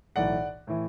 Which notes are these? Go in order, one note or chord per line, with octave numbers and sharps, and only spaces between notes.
B1 A2 E3 D5 F#5
A2 E3